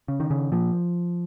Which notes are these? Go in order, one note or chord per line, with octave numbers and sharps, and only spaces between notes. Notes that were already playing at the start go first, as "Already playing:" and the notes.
C#3
D#3
C#3
A#2 F3